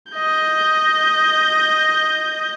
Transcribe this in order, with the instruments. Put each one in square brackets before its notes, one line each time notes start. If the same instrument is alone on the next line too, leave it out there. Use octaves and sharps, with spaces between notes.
[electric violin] D#5 G6